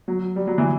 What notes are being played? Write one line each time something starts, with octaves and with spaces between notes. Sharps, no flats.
F#3
G3
F#3
E3